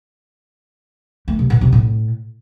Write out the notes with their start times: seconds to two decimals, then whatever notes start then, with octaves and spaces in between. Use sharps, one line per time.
1.28 A3
1.39 C3
1.50 A2
1.61 C3
1.73 A2